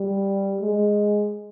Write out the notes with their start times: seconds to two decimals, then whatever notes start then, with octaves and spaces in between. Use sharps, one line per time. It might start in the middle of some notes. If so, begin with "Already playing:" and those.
Already playing: G3
0.61 G#3